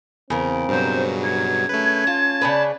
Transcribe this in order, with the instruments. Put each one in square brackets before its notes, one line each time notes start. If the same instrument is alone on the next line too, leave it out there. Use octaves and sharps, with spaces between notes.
[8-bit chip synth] E2 [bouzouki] C#3 A#4 [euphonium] C4
[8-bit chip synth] G2 B2 F#3 [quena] C5
[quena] G#6
[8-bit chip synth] A3 B4 [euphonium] C#4
[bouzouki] F4 [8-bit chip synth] A5
[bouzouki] C#3 D4 B4